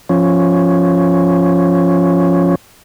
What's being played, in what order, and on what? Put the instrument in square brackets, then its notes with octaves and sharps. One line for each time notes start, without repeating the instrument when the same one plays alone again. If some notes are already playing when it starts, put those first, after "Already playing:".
[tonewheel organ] F3 C#4